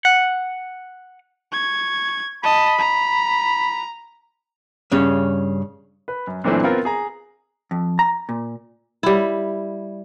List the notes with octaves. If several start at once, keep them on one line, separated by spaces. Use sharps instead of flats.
F#5
C#6 G#6
D#5 A5 B5
A#5
G2 C#3 C#4
B4
F#2
F#2 A#2 E3 A3 C4 D4
B3 C4 F4 A#4
G#4 A#5
F2
A#5
A#2
G3 E4